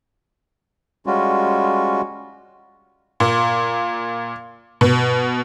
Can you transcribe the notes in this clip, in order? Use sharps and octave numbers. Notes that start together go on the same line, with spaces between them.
G3 G#3 C#4 F4 F#4
A#2
B2